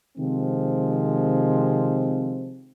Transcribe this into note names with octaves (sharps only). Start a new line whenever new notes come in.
C3 D#3 F3 G#3 C4